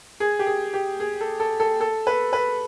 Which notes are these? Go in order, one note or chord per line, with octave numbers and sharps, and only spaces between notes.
G#4
G4
G#4
G4
G#4
A4
A4
A4
A4
B4
B4